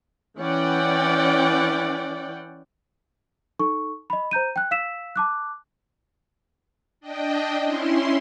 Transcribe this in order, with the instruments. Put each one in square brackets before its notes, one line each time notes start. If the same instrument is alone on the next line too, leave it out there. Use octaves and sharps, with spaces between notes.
[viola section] E3 C#4 D5 F#5 G5
[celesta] D#4 A4 C#6
D#5 B5
C5 A#5 G6 D#7
G5 F#6
F5 E6 B6 E7
A5 D6 F#6
[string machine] D4 D#5 G5
C#4 E4 C6